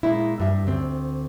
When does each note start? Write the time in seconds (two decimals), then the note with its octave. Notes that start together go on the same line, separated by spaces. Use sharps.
0.03 A#2 G#3 E4
0.40 G2 E5
0.67 D2 C4